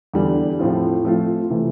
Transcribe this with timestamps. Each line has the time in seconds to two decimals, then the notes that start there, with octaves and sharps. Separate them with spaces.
0.14 E2 D3 G3
0.59 A2 F3 C4 F4
1.04 F3 A3 C4 F4
1.50 C3 E3 A3